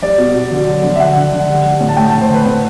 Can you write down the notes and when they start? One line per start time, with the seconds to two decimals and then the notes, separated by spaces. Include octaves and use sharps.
0.02 G3 D5
0.18 B2
0.34 B2
0.51 D3
0.67 F#3
0.83 D3
0.96 E5
1.00 D3 F#5
1.16 D3
1.32 D3
1.49 G3
1.65 G3
1.80 A2
1.89 A5
1.97 A3 G5
2.10 A5
2.14 D3
2.21 C5
2.30 D3 B4
2.45 A2